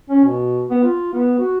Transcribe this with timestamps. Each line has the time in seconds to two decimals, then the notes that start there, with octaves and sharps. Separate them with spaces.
0.10 C#4
0.25 B2
0.70 B3
0.84 F4
1.14 B3
1.39 F#4